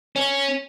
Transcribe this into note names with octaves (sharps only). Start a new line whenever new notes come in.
C#4